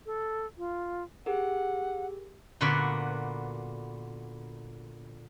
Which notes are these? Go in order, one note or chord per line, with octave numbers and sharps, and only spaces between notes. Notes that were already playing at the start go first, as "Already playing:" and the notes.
A4
F4
G4 G#4 A#4 F#5
A#2 D3 B3 F#4 B4